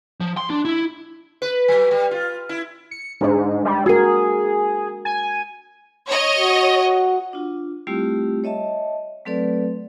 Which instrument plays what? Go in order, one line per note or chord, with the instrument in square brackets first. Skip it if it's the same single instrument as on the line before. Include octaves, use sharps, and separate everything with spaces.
[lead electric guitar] F3
C6
D4
E4
[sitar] B4
F#3
G3
F4
E4
[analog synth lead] C#7
[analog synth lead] G#2 [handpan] G#3 D4
[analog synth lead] G3
[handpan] F#4 A#4 [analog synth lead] G#4
[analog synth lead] G#5
[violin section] C#5 D#5
[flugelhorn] F#4
[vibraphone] D4 F4
G3 A3 C4 E4 F4 G4
C#5 D#5 E5 A5
F#3 A3 C4 A4 B4 D5